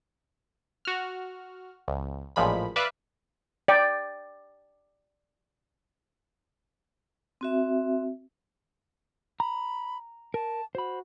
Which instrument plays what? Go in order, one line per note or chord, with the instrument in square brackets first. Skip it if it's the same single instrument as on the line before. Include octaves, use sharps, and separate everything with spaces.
[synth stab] F#4 F6
C#2
A1 A#2 F3 G#3 B5
B4 D5 E5 F5 D6 F#6
[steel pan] D5 G5
[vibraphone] C4 F#4 E5
[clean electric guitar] A#5 [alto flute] B5
[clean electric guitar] A#4 [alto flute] A5
[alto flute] F#4 [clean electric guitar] C5 B5